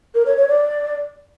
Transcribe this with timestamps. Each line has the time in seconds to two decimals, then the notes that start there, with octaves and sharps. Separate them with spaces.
0.15 A#4
0.26 C#5
0.37 C#5
0.48 D5